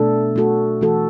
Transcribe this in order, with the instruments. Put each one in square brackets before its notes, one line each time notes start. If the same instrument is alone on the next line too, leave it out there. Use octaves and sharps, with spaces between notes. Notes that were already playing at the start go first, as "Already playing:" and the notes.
Already playing: [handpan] B2 A3 D4 A4
A3 F#4 A4
E3 A3 F#4 A4